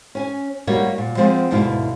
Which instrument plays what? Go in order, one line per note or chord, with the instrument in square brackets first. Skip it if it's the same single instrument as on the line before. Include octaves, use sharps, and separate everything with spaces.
[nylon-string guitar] C#4 G#5
G3 A#3 D#4 F#4 C#5
A#2
F3 G#3 B3 C4 F4
D2 G#2 B2 E4 F5